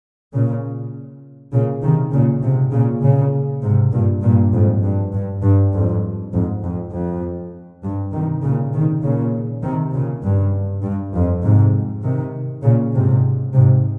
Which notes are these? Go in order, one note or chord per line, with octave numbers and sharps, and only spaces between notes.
A#2 C#3
A#2 C#3
C3 D#3
A#2 C#3
G#2 C3
A#2 C#3
A#2 C#3
G#2 C3
G2 A#2
G2 A#2
F2 G#2
G2
G2
G2
F2 G#2
F2 G#2
F2
F2
G2
C3 D#3
A#2 C#3
C3 D#3
A#2 C#3
C3 D#3
A#2 C#3
G2
G2
F2
G#2 C3
C3 D#3
A#2 C#3
G#2 C3
G#2 C3